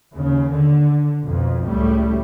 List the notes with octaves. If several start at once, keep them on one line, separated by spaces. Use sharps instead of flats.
D#2 C#3
D3
B1 F2
C#2 A2 G3 A3